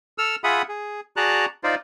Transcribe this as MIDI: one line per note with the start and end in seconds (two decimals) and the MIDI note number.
0.18 0.36 69
0.18 0.36 88
0.18 0.36 89
0.44 0.62 65
0.44 0.62 68
0.44 0.62 76
0.44 0.62 78
0.44 0.62 83
0.44 0.62 87
0.69 1.00 68
1.16 1.46 66
1.16 1.46 68
1.16 1.46 74
1.16 1.46 81
1.16 1.46 82
1.16 1.46 90
1.64 1.75 63
1.64 1.75 65
1.64 1.75 72
1.64 1.75 74